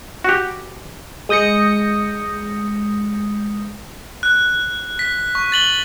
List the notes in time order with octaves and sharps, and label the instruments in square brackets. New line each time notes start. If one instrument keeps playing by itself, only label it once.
[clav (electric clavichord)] F#4 G4
[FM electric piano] G#3 D#6 G6 A#6 C#7
[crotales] F#6
B6
C#6
A6 F#7 G7